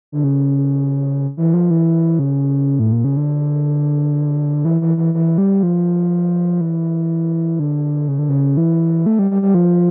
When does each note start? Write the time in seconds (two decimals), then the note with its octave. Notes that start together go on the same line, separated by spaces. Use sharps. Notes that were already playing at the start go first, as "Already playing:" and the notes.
0.12 D3
0.24 C#3
1.37 E3
1.54 F3
1.70 E3
2.19 C#3
2.79 A2
2.92 A#2
3.04 C#3
3.17 D3
4.65 E3
4.81 E3
4.97 E3
5.14 E3
5.38 G3
5.63 F3
6.61 E3
7.60 D3
8.08 C#3
8.19 D3
8.29 C#3
8.57 E3
9.06 A3
9.19 G3
9.31 G3
9.42 G3
9.54 F3